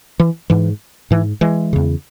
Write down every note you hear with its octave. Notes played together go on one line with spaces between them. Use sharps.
E3
G#2 E3
G#2 E3
E3 G#3
E2 C#3